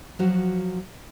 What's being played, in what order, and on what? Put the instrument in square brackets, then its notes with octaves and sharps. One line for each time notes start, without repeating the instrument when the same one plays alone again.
[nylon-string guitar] F3 F#3 F#4